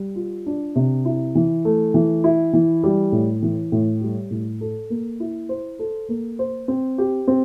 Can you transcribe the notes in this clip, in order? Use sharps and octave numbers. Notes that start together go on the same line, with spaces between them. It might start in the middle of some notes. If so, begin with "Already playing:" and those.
Already playing: G3
F4
D4
C3
E4
E3
A3
E3
E4
E3
G3
A2
E3
A2
G3
A2
A4
A#3
E4
C5
A4
A#3
C5
C4
G4
C4